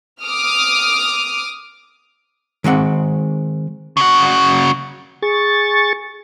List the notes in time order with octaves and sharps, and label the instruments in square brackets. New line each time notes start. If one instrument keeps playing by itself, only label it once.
[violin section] D6 D#6 F6
[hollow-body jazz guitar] D#3 G#3 C4 F#5
[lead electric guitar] C#3 F#4
[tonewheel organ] G#4 C#6 A6